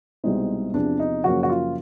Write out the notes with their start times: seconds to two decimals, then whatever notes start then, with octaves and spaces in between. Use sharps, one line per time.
0.24 C2 B2 G#3 C4 D#4
0.74 E2 C3 F3 D4
0.99 D#4
1.24 F#2 C#3 F3 A#3 C#4 F#4
1.43 F#4
1.49 F4